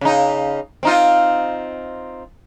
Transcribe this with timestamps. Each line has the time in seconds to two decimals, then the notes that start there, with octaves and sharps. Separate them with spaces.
0.01 C#3 D#4
0.83 C4 D#4 F4